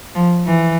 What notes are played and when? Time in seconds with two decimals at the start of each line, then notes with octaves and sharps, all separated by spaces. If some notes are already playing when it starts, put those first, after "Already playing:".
0.15 F3
0.46 E3